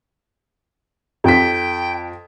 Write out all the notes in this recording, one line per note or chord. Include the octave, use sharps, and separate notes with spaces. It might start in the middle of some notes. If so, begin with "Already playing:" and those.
F2 G5 B6